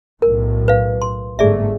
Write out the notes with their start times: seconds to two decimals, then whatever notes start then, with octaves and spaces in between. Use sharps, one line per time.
0.22 B1 A2 A#4
0.68 B4 F5
1.02 C6
1.39 G1 G#2 A3 G#4 D5 E5